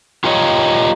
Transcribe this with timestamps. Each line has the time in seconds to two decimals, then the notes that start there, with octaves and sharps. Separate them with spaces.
0.24 F4 G4 A#4 C#5 D#5